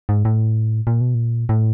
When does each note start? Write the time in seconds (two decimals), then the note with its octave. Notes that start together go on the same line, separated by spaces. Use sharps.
0.09 G#2
0.25 A2
0.87 A#2
1.01 B2
1.14 A#2
1.49 A2